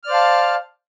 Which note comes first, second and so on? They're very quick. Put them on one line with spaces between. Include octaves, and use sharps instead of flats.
F6 D5 C5 F5 A5